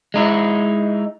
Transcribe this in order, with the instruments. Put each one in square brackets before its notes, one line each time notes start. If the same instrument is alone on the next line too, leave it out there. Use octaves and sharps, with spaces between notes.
[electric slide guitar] G#3 D#4 E4